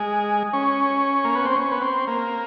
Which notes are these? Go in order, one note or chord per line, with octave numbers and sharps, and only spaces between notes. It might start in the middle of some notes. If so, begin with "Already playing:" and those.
Already playing: G#3
C#4
A#3
B3
C4
C#4
B3
C4
A#3